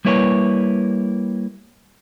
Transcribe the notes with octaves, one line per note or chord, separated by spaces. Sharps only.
G3 A#3 E4 B4 C#5